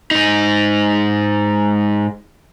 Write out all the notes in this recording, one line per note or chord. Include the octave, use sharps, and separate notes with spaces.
G#2 D#4